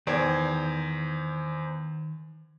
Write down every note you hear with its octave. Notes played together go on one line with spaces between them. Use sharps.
E2 D#3 C5 D5 G#6